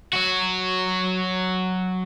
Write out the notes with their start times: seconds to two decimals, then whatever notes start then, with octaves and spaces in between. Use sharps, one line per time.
0.13 F#3 F#4